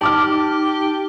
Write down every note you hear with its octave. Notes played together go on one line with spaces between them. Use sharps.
D#4 G4 A5 D6 F6